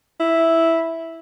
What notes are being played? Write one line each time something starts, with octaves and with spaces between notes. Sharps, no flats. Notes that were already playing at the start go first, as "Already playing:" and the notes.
E4